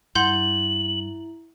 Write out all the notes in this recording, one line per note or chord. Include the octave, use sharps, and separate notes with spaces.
G2 E4 F#5 C6 G6 F#7